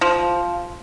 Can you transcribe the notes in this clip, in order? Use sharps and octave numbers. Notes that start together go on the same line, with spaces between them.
F3